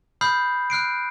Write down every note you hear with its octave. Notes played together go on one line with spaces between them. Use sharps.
B5 D#6 F6 G6 C7
F6 F#6 C7 D7